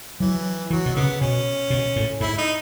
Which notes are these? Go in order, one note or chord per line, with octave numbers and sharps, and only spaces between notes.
E3 F#3
E3 F#3
B2
C#3 B3
B2 C#4
B2
A2
G#2 E4
D#4